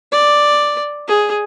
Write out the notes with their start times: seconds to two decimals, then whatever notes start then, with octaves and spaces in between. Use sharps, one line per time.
0.12 D5
1.08 G#4